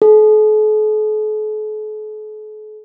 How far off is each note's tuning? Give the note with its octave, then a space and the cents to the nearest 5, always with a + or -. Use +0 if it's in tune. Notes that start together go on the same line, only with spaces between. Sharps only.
A4 -45